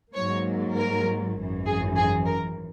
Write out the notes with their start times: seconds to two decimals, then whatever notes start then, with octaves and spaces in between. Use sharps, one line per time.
0.13 G#2 F#3 A#3 C#5
0.75 A#4
1.35 G#1 F#2 E3
1.66 G#4
1.96 G#4
2.26 A#4